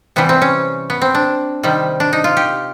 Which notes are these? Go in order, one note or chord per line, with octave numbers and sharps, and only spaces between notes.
C3 E3 G3 B3
C4
C#4
B3
C4
D4
C3 D#3 G3
D4
D#4
F4
G4